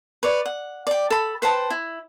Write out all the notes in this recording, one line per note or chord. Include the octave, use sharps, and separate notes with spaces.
B4 C#5 D5
F#5
D5 G5
A4 B5
B4 C5 G5 A5
E4